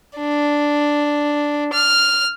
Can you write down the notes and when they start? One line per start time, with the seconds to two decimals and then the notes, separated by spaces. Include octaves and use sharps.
0.18 D4
1.73 F6